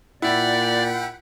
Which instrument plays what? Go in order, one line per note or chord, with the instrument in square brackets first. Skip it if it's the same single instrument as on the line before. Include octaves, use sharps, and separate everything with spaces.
[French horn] A#2 [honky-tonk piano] E4 [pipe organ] D5 [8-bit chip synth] F#5 G5 B5